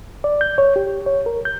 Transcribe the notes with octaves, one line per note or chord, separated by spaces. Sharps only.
D5
G6
C#5
G4
C#5
A#4
G6